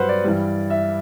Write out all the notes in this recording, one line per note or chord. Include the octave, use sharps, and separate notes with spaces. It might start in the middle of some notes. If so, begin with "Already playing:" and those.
Already playing: G2 F#3 B4 C5 F#5
D5
G2 E3 G3
E5